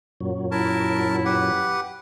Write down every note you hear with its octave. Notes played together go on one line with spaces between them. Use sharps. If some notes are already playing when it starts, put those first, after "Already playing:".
F#2 A#2 F#3
E4 A#4 A5
G4 B4 F#5